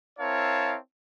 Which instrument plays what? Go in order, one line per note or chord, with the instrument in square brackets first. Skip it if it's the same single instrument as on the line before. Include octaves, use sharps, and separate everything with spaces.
[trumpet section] C4 E4 A#4 C#5 F5 A5